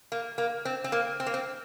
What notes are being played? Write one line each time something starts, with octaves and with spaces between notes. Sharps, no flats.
A#3
A#3
C4
C4
A#3
C4
A#3
C4